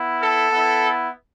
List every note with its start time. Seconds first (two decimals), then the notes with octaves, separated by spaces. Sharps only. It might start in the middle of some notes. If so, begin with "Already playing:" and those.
Already playing: B3 E4
0.21 A4
0.51 B3 E4